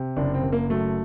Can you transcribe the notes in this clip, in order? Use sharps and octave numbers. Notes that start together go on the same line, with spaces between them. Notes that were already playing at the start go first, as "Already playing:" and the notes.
Already playing: C3
F#1 D4
C4
F#1
A#3
F#3 A3